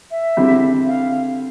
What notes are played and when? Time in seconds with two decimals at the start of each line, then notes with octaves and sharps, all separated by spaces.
0.11 E5
0.37 D3 G3 C4 E4
0.87 F5